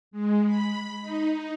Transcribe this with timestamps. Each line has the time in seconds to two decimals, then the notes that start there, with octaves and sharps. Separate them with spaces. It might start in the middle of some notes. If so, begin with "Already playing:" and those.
0.11 G#3
0.45 B5
1.01 D#4